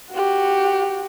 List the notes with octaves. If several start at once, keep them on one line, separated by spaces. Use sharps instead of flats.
F#4 G4